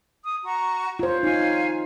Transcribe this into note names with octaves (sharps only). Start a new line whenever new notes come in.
D#6
F#4 A#5 C#6
F4 C5 C#5
D#4 F4 C#5 F5 G#5